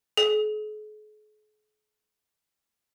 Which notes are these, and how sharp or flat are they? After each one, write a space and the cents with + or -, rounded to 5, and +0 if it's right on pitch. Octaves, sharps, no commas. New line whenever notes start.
G#4 +45